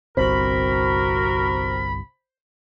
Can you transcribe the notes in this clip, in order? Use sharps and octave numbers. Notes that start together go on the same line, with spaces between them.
G1 C2 C3 C4 F#4 A#4 C5 B5